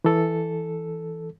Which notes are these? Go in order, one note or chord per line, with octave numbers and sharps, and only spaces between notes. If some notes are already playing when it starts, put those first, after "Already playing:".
E3 A4